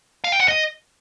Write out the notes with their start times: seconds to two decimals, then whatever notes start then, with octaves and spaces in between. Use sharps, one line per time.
0.24 F5
0.32 G5
0.40 F#5
0.48 D#5